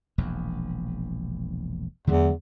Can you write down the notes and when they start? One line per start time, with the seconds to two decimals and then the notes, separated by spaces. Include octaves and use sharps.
0.18 E1 A#1 E2
2.07 E2 D3 F#3 G#3